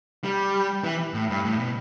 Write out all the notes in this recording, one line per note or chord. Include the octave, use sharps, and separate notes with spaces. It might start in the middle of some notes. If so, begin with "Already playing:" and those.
G3
E3
A2
G2
A2
B2